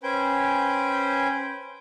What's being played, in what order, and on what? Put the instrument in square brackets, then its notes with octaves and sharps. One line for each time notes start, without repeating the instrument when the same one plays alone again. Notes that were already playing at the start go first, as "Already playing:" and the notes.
[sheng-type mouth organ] C#4 B4 C5 G5 G#5 G6